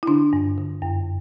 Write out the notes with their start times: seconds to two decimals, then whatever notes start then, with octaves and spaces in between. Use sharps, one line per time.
0.03 E4
0.07 D3 D4
0.33 G2
0.57 D3
0.82 F#2